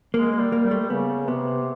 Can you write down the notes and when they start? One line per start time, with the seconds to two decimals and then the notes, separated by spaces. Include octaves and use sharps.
0.14 G#3 A#3
0.33 A#3
0.39 G3
0.52 A#3
0.65 G3
0.71 A3
0.90 C#3 B3
1.28 C3 B3